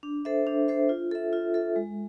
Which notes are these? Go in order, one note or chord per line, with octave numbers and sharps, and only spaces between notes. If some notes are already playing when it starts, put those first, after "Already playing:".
D4
A4 C5 E5
D4
A4 C5 E5
F4
A4 E5
F4
A4 E5
G#3